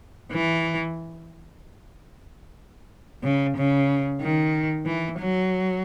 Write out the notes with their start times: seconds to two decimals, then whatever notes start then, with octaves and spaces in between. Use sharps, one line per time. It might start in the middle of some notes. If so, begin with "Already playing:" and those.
0.32 E3
3.24 C#3
3.56 C#3
4.21 D#3
4.86 E3
5.19 F#3